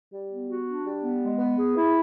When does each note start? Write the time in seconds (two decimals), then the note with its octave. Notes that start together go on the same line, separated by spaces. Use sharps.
0.12 G3
0.30 B3
0.48 F#4
0.66 D4
0.84 G3
1.02 B3
1.22 G#3
1.39 B3
1.58 G#4
1.76 E4